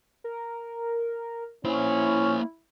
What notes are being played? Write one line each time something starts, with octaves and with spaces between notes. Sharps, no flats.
A#4
A#3 C#4 E4 C5